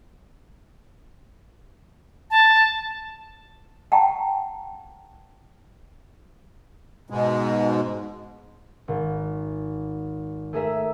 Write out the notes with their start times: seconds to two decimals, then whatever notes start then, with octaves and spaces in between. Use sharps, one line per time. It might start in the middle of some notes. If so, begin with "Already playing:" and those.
2.31 A5
3.92 F#5 G5 A5 A#5 C#6
7.10 G#2 B2 G#3
8.88 G#1
10.53 A3 G#4 A#4 E5